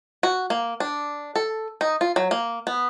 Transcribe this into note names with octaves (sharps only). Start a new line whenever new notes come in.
F#4
A#3
D4
A4
D#4
F4
F#3
A#3
B3